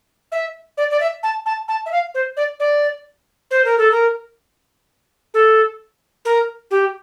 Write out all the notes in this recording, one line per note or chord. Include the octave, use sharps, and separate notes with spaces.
E5
D5
D5
E5
A5
A5
A5
E5
F5
C5
D5
D5
C5
A#4
A4
A#4
A4
A#4
G4